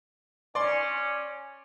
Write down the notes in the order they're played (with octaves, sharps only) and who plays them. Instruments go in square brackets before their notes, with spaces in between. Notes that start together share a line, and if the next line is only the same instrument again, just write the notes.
[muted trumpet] C#4 [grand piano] D5 C6